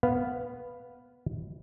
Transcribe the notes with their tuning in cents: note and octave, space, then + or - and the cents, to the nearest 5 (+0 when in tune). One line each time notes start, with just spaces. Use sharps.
B3 +0 B4 +0 F5 +0